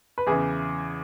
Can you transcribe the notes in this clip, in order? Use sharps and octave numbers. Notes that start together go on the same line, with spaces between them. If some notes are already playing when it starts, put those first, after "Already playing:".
B4
E2 C#3 E3 G#4